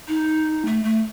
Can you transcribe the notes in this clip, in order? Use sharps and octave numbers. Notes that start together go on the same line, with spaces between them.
D#4
A3
A3